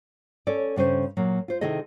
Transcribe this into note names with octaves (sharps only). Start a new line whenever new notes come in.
C#4 A4 C#5 D5
G2 C#3 C#4 C5
A#2 F#3 A#3
F4 C5
C3 D#3 E4 G#4 A4 D#5